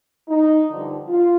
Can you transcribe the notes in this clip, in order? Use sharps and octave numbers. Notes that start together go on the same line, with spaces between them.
D#4
G2 D3 F3
F4